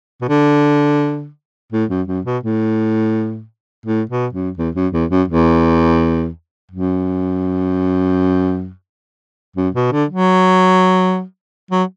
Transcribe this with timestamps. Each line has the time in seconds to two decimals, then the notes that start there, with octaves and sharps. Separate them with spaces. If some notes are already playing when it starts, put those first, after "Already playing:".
0.21 B2
0.29 D3
1.72 A2
1.90 F#2
2.08 F#2
2.25 B2
2.43 A2
3.86 A2
4.10 B2
4.33 F#2
4.57 E2
4.75 F#2
4.93 E2
5.10 F#2
5.28 E2
6.71 F#2
9.56 F#2
9.75 B2
9.92 D3
10.10 F#3
11.71 F#3